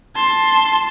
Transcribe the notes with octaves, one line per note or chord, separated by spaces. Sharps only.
A5 C6